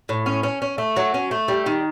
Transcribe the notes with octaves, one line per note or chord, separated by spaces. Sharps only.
A2
C#4
C#4
C#4
A3
F#3
C#4
A3
G3
D#3